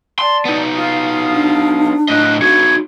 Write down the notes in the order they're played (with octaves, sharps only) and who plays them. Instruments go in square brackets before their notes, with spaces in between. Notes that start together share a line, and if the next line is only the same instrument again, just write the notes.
[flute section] D5 A5 [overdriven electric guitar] C6
[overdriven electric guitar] B3 D#4
[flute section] F4 F5 D#6
[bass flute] D4
[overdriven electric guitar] A2 D#5 [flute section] F4 F#6
[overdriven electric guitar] D#4 F#4 [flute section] C#6 G#6